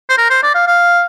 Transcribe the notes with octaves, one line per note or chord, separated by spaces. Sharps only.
C5
A#4
C5
D5
F5
F5